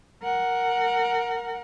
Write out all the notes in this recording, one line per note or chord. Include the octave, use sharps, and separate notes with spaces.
A#4 F#5